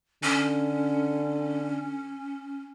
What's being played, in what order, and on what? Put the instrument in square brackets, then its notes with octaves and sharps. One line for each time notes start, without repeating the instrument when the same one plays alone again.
[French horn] D3 [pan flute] C#4